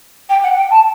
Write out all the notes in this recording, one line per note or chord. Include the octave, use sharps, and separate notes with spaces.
G5
F#5
G5
A5